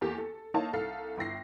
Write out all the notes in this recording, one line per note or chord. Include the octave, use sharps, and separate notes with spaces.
E2 A#3 G4 A4
A4
A#3 D#4 E4 C#5 F5 A5
C2 A4 F5 F6 C7
G1 E4 G5 A#6 C7